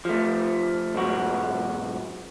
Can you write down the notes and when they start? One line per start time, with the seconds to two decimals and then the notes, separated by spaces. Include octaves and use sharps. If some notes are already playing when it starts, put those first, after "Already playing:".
0.05 F3 A3
0.94 B1 G#2 F#4